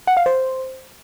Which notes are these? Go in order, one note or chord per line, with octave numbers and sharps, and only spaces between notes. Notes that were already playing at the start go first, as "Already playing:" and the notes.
F#5
F5
C5